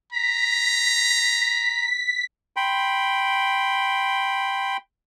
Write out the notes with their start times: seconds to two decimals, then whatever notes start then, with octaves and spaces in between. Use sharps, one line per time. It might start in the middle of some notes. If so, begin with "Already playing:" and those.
0.13 A#5 B6
2.56 G5 B5 C6